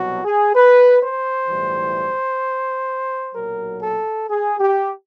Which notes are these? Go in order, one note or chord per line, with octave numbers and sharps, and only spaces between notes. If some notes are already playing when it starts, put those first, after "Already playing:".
Already playing: C2 B2 F#3 F#4
G#4
B4
C5
B1 A2 E3 G3
B1 A#2 F#3 A#4
A4
G#4
G4